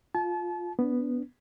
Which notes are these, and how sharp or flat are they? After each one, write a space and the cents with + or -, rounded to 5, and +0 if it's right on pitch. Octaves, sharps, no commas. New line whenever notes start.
F4 +10 A5 -35
B3 +0 D4 -30